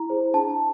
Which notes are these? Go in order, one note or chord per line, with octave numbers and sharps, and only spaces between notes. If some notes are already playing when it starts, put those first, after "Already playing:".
Already playing: E4 A#5
G#4 C5
D4 A5